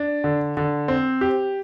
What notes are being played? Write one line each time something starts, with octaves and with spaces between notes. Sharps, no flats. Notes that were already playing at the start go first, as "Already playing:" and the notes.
Already playing: D4
D3
D3
C4
G4